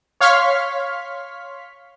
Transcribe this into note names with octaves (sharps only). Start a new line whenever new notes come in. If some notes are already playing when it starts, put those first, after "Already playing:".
C#5 F5 C6 C#6 F6 B6